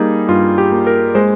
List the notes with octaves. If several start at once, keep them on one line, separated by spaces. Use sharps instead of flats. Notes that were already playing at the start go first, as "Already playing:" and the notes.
Already playing: G3 A#3 D#4 G#4
G2 F4
G4
A#3
A#4
G#3 C5